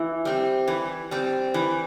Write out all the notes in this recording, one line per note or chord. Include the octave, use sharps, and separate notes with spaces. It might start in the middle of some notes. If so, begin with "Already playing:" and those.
Already playing: E3 E4
G3 C4
E3
G3 C4
E3